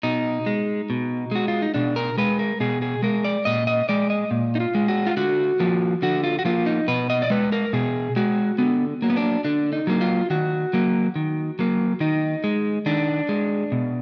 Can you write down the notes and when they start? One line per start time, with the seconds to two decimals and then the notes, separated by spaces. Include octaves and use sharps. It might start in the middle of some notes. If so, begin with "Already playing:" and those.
0.03 B2 D#4
0.46 G#3
0.90 B2
1.31 G#3 F#4
1.48 F4
1.62 D#4
1.74 B2 D4
1.96 A#4
2.18 G#3 B4
2.39 A#4
2.60 B2 G#4
2.82 G#4
3.03 G#3 A#4
3.24 D5
3.45 A#2 D#5
3.67 D#5
3.89 G#3 D5
4.10 D#5
4.31 A#2
4.55 D#4
4.60 F4
4.75 G#3
4.88 F#4
5.07 F4
5.17 D3 F#4
5.60 F3 A#3
6.02 D3 F#4
6.24 F4
6.39 F#4
6.45 F3 A#3 F4
6.66 D#4
6.88 B2 B4
7.10 D#5
7.22 D5
7.30 G#3 B4
7.52 A#4
7.73 B2 G#4
8.16 G#3 F#4
8.58 D3 B3
9.02 F#3 A#3
9.10 B3
9.17 D4
9.45 D3 D4
9.73 D#4
9.87 F#3 A#3
10.01 F4
10.30 D#3 F#4
10.73 F#3 A#3
11.16 D#3
11.59 F#3 A#3
12.00 D#3 D#4
12.44 G#3
12.86 D#3 D4
13.29 G#3
13.72 B2